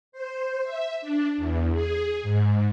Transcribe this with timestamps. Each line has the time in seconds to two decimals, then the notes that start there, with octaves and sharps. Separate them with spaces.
0.12 C5
0.63 E5
1.01 D4
1.37 E2
1.73 G#4
2.23 G#2